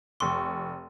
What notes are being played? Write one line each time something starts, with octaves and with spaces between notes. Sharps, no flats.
F1 C6 C#6